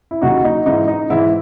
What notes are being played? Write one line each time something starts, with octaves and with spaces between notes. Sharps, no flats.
E4
D#2 C#3 F#3 D#4 F#4
D#4
G#2 E3 D#4
D#4
G#2 E3 E4